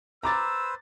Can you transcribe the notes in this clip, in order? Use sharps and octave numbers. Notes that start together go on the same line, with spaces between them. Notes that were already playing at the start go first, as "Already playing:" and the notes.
B4 C5 A#5 D6 E6 A6